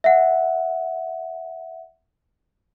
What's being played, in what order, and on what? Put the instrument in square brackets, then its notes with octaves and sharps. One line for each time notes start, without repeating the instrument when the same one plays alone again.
[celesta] E5 F#5